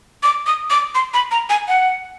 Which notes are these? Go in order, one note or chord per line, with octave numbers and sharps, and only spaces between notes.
D6
D#6
D6
C6
B5
A#5
G#5
F#5